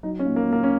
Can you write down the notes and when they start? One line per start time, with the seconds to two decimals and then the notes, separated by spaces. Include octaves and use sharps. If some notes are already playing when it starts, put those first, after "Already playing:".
0.03 F#3 D#4
0.19 C#4
0.25 A#2
0.36 A#3
0.47 A#2
0.52 A#3
0.63 C#4